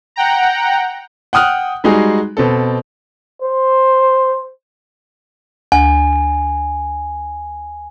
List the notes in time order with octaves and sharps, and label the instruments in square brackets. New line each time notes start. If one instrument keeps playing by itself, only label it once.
[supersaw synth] F#5 G5 A#5
[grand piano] F#5 G5 D#6 F6 F#6
G3 G#3 D#4 F#4 G#4
B2 C4 A4
[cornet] C5
[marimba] D2 [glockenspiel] G#5